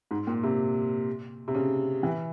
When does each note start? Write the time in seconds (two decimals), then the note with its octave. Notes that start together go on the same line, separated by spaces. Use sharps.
0.11 G#2
0.27 A#2
0.43 C3
1.48 C3
1.55 C#3
2.03 E3